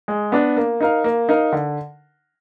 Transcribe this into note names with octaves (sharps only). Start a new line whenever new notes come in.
G#3
B3 D4
A#3
D#4 A#4 F5
A#3
D#4 A#4 F5
D3